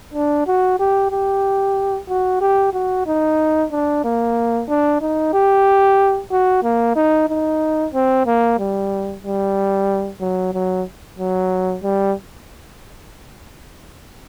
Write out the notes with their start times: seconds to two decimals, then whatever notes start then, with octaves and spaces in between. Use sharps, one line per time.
0.13 D4
0.47 F#4
0.79 G4
1.11 G4
2.09 F#4
2.41 G4
2.73 F#4
3.06 D#4
3.71 D4
4.04 A#3
4.68 D4
5.01 D#4
5.33 G4
6.31 F#4
6.63 A#3
6.96 D#4
7.29 D#4
7.94 C4
8.26 A#3
8.59 G3
9.23 G3
10.20 F#3
10.53 F#3
11.19 F#3
11.83 G3